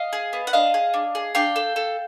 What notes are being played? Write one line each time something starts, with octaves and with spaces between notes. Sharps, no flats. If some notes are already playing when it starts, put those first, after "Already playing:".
Already playing: D#5 F5
G#4
B3
F#5
D4 D#5 F5
G#4
D4
G#4
D4 F5 G5
A4
A4